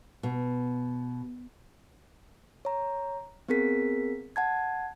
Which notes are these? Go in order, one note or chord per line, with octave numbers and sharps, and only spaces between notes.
B2
C#5 A#5
B3 C4 G#4 A#4 B6
F#5 A5 G#6